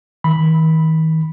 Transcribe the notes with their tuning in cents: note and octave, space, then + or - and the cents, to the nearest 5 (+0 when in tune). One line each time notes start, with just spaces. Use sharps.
D#3 +40 B5 +0